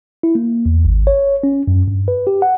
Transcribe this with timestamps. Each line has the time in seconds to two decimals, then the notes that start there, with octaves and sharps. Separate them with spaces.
0.23 E4
0.35 A#3
0.66 E2
0.85 G#1
1.07 C#5
1.43 C#4
1.68 F#2
1.88 G2
2.08 B4
2.27 G4
2.42 F#5